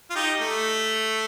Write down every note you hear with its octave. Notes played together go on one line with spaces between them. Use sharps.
F4
D#4 G4
A3